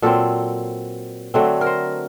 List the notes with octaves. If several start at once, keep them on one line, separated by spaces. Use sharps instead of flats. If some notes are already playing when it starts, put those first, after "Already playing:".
A#2 F#3 C4 A4
D3 F#3 A3 C4
A#4
C5